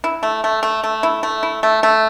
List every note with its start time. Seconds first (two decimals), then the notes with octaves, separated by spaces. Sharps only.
0.04 E4
0.23 A3
0.44 A3
0.63 A3
0.84 A3
1.03 E4
1.23 A3
1.43 E4
1.63 A3
1.83 A3